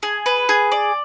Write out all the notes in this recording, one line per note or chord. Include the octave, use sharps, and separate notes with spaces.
G#4
B4
G#4
D5